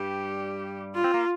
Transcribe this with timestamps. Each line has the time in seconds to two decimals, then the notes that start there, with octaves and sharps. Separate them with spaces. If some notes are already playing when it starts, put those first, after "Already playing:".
Already playing: G2 G3 G4
0.95 F4
1.04 C4
1.14 A#3